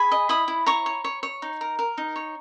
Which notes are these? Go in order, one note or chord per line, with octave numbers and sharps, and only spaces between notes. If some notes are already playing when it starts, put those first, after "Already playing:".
Already playing: G#4 G#5 B5
D#5
E4 B5 D#6
E4
C#5 A#5 C#6
C#5
C#5
C#5
D#4
A#4
A#4
D#4
C#5